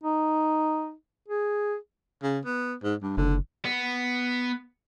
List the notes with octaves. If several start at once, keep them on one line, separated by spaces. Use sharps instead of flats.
D#4
G#4
C#3
B3
G#2
G2
F#1 D3
B3